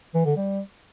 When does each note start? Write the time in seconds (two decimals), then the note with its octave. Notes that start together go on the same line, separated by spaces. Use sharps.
0.14 E3
0.25 D3
0.36 G3